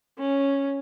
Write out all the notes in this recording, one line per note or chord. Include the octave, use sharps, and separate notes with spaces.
C#4